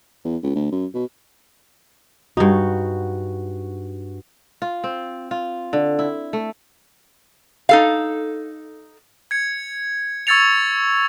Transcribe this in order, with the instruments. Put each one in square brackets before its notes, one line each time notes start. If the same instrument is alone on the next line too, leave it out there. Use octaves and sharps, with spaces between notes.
[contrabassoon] E2
C#2
D2
F#2
B2
[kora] G2 D#4 [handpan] F#4
[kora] F4
C4
F4
D3
E4
A3
[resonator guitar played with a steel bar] D#4 A4 F5
[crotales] G#6 C#7
C#6 E6 G#6 A6 C#7 F7